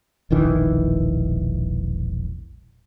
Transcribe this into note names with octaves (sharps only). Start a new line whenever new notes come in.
E1 A#1 D#3 E3